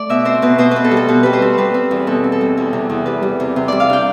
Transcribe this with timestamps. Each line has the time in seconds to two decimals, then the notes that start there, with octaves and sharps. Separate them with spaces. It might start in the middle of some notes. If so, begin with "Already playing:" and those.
Already playing: A3 D5
0.09 B2 E5
0.25 C4 C5
0.42 B2 B4
0.58 B2 C5
0.71 C4 B4
0.84 A4
0.91 G3
0.97 A4
1.08 B2 B4
1.23 G3 B4
1.33 C5
1.42 C4
1.58 G3 B4
1.74 C4
1.91 E2
2.07 B2 A4
2.24 C4
2.32 A4
2.41 G3
2.57 E2
2.73 C3
2.90 E2
3.06 G3 B4
3.23 G3
3.40 C3
3.56 C3
3.68 G3 D5
3.80 F5
3.89 D4 G5